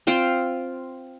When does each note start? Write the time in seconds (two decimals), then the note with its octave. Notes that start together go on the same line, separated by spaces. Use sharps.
0.07 C4 F4 C5 G5